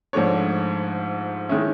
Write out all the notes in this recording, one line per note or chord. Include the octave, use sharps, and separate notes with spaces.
G#2 F3 A3 D4 C#5
D#3 G#3 C#4 E4